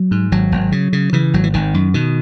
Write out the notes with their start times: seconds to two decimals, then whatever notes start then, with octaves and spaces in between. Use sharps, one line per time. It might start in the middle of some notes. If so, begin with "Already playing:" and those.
Already playing: F#3
0.11 G#2
0.32 G#1 F#3
0.52 G#1
0.72 C#3
0.93 C#3
1.13 C#3 E3
1.34 G#1 F#3
1.43 E3
1.54 G#1 D#3
1.74 F#2
1.94 B2 D#3